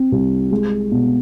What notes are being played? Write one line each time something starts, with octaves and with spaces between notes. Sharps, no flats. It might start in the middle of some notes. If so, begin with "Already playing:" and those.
Already playing: C4
C2
G#3
B2